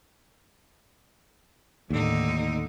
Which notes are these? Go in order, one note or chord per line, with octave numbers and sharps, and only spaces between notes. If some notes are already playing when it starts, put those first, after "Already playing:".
D#2 A2 D3 D#4